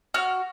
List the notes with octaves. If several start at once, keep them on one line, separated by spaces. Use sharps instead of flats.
F#4 F6